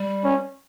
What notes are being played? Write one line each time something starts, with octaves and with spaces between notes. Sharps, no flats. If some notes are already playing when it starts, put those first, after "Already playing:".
Already playing: G3
C#4